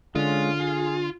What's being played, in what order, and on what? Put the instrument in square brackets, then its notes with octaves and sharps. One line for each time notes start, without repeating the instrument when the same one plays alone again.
[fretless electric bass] D3 [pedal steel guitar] G#3 C#4 [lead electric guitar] F4
[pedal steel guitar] G#4